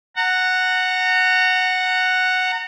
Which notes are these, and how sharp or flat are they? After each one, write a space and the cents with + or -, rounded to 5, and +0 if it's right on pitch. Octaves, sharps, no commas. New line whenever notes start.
F#5 +0 A#5 -30